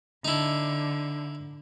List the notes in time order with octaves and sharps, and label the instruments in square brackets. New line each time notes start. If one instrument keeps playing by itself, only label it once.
[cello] D3 [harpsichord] D#4 E4